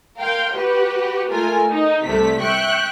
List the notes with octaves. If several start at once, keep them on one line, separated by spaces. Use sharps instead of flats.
A#4 F5 G5 C6
F#4 G4 B4
A3 F4 A#4 G#5
D#4
C2 C3 A3 B6
E5 G5 C#6 F#6